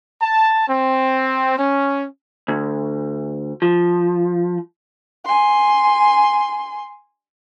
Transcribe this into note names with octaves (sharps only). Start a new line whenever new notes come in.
A5
C4
C#4
D2
F3
G#5 C6